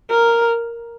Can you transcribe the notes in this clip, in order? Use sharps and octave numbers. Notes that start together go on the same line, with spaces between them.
A#4